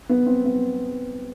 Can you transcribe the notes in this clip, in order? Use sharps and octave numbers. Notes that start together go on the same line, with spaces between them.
B3
C4
B3